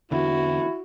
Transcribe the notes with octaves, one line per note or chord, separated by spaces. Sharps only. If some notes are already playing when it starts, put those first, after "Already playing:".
E2 D3 E3 E4 F#4